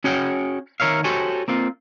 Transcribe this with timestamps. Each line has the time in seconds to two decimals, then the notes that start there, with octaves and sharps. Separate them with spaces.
0.04 C#4 F#4 G#4 C#5 F#5 G5
0.80 D#3 A#4 C#5 E5 F5
1.04 F#4 G4 A4 C5 C#5 G#5
1.48 A#3 C4 F4